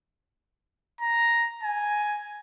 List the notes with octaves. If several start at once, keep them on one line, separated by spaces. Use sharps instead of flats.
A#5
G#5